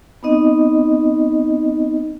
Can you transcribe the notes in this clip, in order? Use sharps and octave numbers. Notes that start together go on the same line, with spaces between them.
B3 C4 D#4 D#5